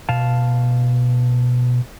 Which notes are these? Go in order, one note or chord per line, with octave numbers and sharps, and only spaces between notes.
B2 F5 A5